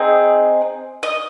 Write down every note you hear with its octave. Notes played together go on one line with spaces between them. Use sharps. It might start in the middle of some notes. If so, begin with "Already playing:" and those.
Already playing: C4 D#4 G#4
D#5